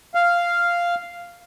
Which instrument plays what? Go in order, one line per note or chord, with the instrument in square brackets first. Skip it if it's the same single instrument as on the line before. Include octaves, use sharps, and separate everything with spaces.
[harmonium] F5